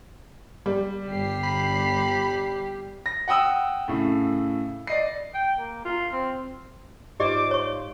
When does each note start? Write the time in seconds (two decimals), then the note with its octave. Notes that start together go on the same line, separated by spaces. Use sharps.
0.66 G3
1.08 G1 G4 C7
1.44 B5
3.06 A#6
3.28 F#5 G5 D#6 E6
3.88 A2 C#3
4.87 D5 D#5 C7
5.34 G5
5.57 A#3
5.85 F4
6.12 C4
7.20 G#2 F4 G4 C5 D5 D#5 D6
7.51 C#5 C#6